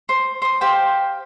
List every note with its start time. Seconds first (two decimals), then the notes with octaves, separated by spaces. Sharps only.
0.09 C5
0.42 C5 D#6
0.61 G4 C5 F5 G5